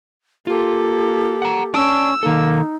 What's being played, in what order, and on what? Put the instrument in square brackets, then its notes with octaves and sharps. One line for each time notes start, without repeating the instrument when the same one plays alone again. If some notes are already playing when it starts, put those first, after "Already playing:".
[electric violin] A#3 A4 [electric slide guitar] F4 [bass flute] G4
[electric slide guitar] F#5 A#5
[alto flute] C#4 [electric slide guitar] D5 A5 [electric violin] E6
[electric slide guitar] D#3 A4 [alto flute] A#3 [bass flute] D#4